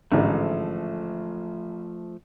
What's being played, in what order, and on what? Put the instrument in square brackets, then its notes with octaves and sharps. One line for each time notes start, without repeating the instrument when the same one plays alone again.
[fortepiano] A1 G#2 D3 [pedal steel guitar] F3 A3